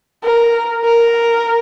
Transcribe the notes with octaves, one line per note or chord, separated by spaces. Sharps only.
A#4
A#4